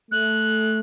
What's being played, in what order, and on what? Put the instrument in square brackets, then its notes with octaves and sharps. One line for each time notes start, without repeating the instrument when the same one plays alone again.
[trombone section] A3 [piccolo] F#6